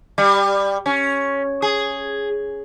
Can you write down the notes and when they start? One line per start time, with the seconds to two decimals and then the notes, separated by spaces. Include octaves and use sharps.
0.18 G3
0.86 C#4
1.62 G#4